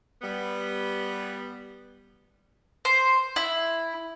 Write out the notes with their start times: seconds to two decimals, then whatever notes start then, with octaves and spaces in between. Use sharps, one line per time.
0.22 G3 B3
2.85 C5
3.36 E4